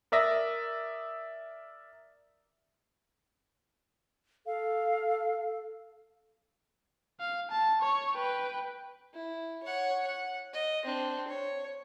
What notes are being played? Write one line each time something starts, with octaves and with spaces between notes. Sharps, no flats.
A#4 D5 E5 D#6 A#6
A4 F5
F5
A5
C#5
B4 G5
E4
C#5 F#5
F#5
D#5
C4 D4
C#5